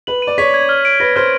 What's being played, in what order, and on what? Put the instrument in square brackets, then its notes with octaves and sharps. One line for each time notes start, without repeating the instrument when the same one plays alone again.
[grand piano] B4 [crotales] F#7
[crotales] D#7
[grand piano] D5
[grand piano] C#5 [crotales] B6
[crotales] G#6
F6
D7
[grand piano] B4 [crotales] A#6
[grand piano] C5 [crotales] F6